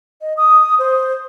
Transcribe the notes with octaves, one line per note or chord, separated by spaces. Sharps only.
D#5
D#6
C5